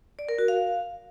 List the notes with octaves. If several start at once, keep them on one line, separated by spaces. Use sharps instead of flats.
D5
A#4
F#4
F5